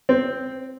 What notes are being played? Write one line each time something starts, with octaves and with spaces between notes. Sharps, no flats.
C4